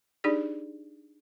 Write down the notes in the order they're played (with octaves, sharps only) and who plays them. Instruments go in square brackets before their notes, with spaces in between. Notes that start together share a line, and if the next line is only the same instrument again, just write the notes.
[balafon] D4 D#4 G4 G#4 D5